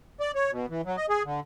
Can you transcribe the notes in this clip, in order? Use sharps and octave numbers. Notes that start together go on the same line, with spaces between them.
D5
C#5
B2
E3
F#3
D#5
G#4
D3